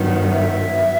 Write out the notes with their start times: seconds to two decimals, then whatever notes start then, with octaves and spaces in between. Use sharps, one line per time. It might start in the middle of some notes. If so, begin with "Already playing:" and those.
Already playing: G2 D#3 F#3 B3
0.31 E5